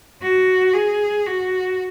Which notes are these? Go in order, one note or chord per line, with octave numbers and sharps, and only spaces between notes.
F#4
G#4
F#4